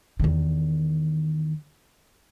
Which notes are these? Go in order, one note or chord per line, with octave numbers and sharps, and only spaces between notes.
E2 D#3